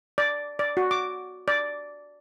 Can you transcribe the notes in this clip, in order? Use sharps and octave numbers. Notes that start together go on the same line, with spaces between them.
D5
D5
F#4
D6
D5